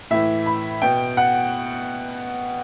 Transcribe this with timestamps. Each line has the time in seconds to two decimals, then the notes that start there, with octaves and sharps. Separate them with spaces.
0.11 A2 E3 E5
0.46 B5
0.82 B2 G5
1.17 F#5